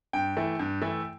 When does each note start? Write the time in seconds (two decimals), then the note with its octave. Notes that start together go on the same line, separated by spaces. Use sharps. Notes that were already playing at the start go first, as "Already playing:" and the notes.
0.13 G2 G5
0.37 E3 A3 E4
0.59 G2
0.82 E3 A3 E4